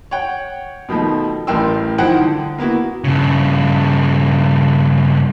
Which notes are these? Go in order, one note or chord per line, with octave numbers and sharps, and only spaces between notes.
C#5 F#5 G5
B2 D#3 F3 A3
A1 A2 A#4 G5 C6 E6
D#3 F3 E4 C5 F#5 G5
D3
A#3 B3 E4 F#4
G2 C#3